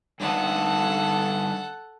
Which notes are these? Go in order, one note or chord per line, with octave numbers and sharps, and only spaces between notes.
G2 D3 D#4 A4 F#5